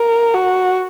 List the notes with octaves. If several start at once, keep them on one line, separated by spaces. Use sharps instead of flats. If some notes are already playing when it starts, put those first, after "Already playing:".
Already playing: A#4
F#4